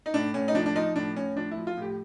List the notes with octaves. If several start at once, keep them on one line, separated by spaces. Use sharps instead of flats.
D#4
A2 D4
A2 C#4
D#4
F3 D4
D4
F3 D#4
A2 D4
A2 C#4
F3 D4
E4
F3
F4
A2 G4